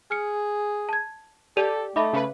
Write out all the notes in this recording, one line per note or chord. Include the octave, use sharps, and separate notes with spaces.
G#4 F6 C#7
A5 G#6
G4 A4 D5 D#7 F7
A3 D#4 E5 B5 D6
C#3 B4